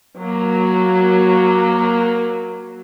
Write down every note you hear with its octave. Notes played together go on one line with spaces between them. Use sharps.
F#3 A#3